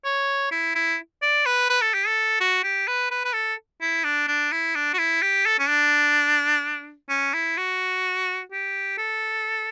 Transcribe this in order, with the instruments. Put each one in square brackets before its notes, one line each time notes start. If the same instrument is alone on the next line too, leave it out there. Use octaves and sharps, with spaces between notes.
[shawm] C#5
E4
E4
D5
B4
B4
A4
G4
A4
F#4
G4
B4
B4
B4
A4
E4
D4
D4
E4
D4
F#4
E4
G4
A4
C#4
D4
C#4
E4
F#4
G4
A4